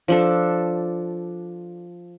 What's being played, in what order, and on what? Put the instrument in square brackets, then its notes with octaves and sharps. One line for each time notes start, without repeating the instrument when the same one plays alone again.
[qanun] F3 D4 A4